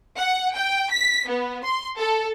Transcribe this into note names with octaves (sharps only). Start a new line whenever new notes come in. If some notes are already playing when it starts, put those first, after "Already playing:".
F#5
G5
B6
B3
C6
A4